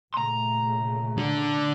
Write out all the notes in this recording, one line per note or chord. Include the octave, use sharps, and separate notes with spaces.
A#2 C#3 A3 A#5 C6
D3